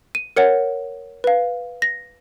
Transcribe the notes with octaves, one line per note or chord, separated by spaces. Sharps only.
D#7
A#4 C#5 F#5 C#7
B4 F5
A#6